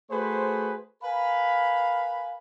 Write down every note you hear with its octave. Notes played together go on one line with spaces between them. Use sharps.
A3 F#4 G#4 B4 C5
A#4 B4 F5 G#5 B5